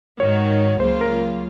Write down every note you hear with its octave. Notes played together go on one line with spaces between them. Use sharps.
G#2 D#3 G#3 D#4 F#4 C#5
C#2 C#3 F#3 A#3 F4 C5
A#4